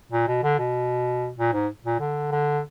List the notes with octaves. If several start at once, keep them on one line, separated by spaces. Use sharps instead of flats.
A#2
B2
D3
B2
A#2
G#2
A#2
D3
D3